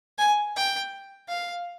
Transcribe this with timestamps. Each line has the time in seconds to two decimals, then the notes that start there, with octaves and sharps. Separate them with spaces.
0.18 G#5
0.56 G5
1.28 F5